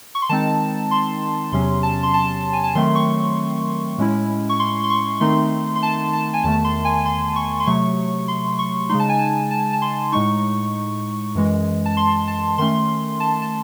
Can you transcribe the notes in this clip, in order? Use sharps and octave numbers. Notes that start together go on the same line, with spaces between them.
C#6
C6
D#3 G#3 C4 D#4 A5
C6
E2 C3 F#3 C#4 C6
A5
C6
A5
G#5
A5
D#3 F#3 A3 C4 C6
C#6
A2 G#3 C#4 E4
C#6
C6
C6
C#6
D#3 A3 C4 D#4 C6
C6
A5
A5
G#5
E2 D#3 A3 A5
C6
G#5
C6
C#6
C6
C3 F#3 A3 C#6
C6
C#6
C#3 G#3 D#4 C6
A5
G#5
A5
A5
A5
C6
A2 G#3 D#4 C#6
F#2 E3 G#3
A5
C6
A5
D#3 A3 C#4 C6
A5
A5